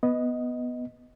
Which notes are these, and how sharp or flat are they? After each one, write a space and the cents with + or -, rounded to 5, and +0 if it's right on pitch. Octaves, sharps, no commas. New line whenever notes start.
B3 +0 D#5 +5